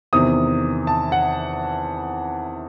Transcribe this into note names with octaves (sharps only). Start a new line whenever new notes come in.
E2 C3 D#3 D#6
A5
F#5